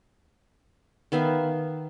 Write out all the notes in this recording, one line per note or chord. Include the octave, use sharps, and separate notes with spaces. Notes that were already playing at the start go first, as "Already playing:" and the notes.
D#3 B3 E5 F5